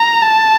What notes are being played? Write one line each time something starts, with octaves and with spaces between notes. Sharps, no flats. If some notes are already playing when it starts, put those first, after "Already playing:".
Already playing: A#5
A5